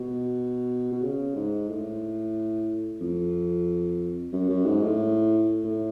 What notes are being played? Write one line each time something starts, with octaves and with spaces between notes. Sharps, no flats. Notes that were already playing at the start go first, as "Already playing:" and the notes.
Already playing: B2
B2
C#3
G#2
A2
F2
F#2
F#2
G#2
A2
A2